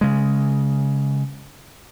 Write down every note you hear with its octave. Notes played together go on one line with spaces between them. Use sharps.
C#3 G#3